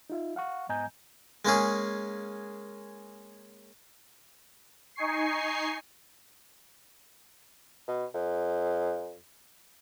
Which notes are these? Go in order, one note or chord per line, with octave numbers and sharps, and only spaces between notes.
D#4 F4 E5
F5 F#5 C#6
G#2 B3 D#5 G#5 A#5 G6
G#3 A#3 C#4 G#4
D#4 G#5 C#6 C7
B2
F2